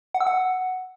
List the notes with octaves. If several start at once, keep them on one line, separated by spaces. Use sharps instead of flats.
F#5
E6
F#5